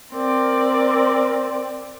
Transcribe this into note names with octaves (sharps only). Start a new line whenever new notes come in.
C4 A#4 D5